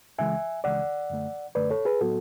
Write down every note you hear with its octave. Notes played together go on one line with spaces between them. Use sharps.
C#2 C#3 E3 G#3 E5 G#5
C#2 C#3 E3 G#3 D5 F#5
F#2 D3 A3
F#2 D3 A3 B4 D5
A4 C#5
G#4 B4
A2 F#3 B3 F#4 A4